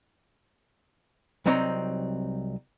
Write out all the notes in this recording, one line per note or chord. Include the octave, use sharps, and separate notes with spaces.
C2 F#3 C4 D#4 C#5